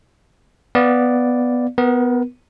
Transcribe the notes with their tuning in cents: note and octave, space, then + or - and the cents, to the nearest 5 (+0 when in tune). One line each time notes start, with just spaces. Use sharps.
B3 +5 D5 +0 F5 +0
B3 +10 A#4 +35